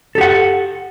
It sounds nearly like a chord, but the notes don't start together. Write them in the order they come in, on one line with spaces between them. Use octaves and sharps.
A4 G4 F#5